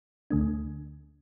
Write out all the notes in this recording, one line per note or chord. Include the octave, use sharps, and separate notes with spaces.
D2 D3 A3 D4